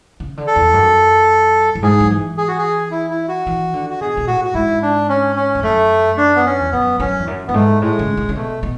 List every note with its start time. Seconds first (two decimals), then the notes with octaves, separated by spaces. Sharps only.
0.20 C#3
0.37 D3
0.47 A4
0.56 E2
0.73 F#2
1.75 F#2
1.83 G#2 G#4
2.00 F#3
2.10 E3
2.38 G#4
2.48 F#4
2.58 G#4
2.91 E4
3.10 E4
3.29 F#4
3.47 E3
3.73 D3
3.90 F#4
4.00 B2 G#4
4.17 B2
4.27 A2 F#4
4.44 F#4
4.54 G#2 E4
4.82 D4
5.09 C#4
5.36 C#4
5.55 E2
5.63 F#2 A3
6.18 D4
6.36 B3
6.46 C#4
6.60 E2
6.72 F#2 B3
7.00 F#2 C#4
7.19 E2
7.27 F#2
7.48 F#2 B3
7.54 G#2 A3
7.82 A2 G#3
7.99 C#3
8.17 C#3
8.29 C#3
8.35 B2 A3
8.63 B2